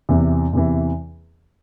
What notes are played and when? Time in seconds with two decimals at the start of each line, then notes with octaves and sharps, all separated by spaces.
0.09 E2 C3 E3
0.53 E2 C3 E3